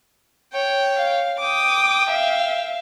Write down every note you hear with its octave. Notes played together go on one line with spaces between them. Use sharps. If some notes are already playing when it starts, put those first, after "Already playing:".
C#5 G5
F5
G5 D6 D#6
E5 F5